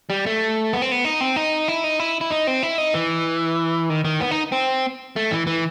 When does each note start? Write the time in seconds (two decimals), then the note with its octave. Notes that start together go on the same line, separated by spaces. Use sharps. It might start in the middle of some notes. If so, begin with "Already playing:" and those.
0.10 G3
0.26 A3
0.73 B3
0.82 C4
0.92 B3
1.05 D#4
1.21 C4
1.36 D#4
1.68 E4
1.84 D#4
2.00 E4
2.21 E4
2.31 D#4
2.47 C4
2.63 E4
2.78 D#4
2.94 E3
3.90 D#3
4.05 D#3
4.21 B3
4.31 D#4
4.52 C4
5.16 A3
5.31 E3
5.47 E3